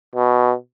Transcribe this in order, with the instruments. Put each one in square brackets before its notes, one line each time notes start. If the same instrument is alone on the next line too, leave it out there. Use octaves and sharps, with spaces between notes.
[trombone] B2